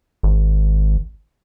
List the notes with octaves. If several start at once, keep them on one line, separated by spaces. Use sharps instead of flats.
G#1